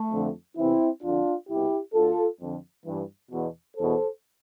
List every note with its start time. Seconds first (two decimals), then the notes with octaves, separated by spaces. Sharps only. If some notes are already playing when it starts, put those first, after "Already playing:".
Already playing: A3
0.12 F2 D3
0.57 E2 C3 E3 C4 E4
1.03 F2 D3 D4 F4
1.49 C2 B2 E4 G4
1.94 D2 D3 F4 A4
2.40 F2 D3
2.85 G2 E3
3.31 E2 B2
3.77 E2 B2 A4 C5